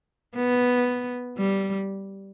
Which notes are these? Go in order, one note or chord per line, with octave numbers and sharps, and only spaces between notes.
B3
G3